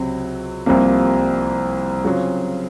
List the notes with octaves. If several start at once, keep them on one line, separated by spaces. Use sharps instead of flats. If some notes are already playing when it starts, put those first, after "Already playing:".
Already playing: C#2 C3 F#3 C4
C2 C3 F3 A#3
C#3 F#3 C4 F4 G#4